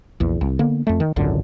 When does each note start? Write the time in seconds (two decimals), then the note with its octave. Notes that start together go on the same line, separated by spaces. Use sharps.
0.20 A#1 E2
0.41 C2
0.59 D3 A#3 B3
0.87 F2 A3
1.00 D#3
1.16 G#1 C#2 F#2 D3